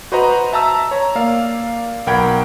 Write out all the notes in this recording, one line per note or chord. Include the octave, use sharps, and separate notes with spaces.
F#4 B4 C5 D#5 A#5
E5 A5 A#5 E6
C#5 A#5
A#3 D5 F5
B1 A#4 F#5 G5 B5 G#6